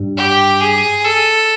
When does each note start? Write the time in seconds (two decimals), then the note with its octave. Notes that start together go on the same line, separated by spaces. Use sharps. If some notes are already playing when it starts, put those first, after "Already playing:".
Already playing: G2 G3
0.17 G4
0.61 G#4
1.05 A4